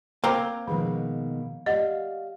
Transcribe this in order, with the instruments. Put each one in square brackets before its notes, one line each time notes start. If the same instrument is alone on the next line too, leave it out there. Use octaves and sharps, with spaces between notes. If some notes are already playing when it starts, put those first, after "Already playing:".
[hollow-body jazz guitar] A#3 A#5 [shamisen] C4
[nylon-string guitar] B2 D#3 G#3 [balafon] F3
[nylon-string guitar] G4 D5 F5 [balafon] D#5 F#5